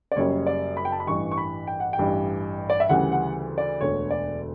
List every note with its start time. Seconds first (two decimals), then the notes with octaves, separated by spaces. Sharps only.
0.12 D5
0.16 F#1 F#2 C#3 G3 C#5
0.47 D5
0.77 B5
0.85 G5
0.92 A5
1.00 B5
1.07 A1 G2 E3 G3 C#6
1.31 C#6
1.37 B5
1.67 G5
1.80 F#5
1.93 G5
1.98 A1 G2 E3 G3
2.70 D5
2.80 E5
2.89 D2 C#3 E3 G3 F#5
3.12 F#5
3.58 D5
3.81 E1 D2 D3 C#5
4.11 D5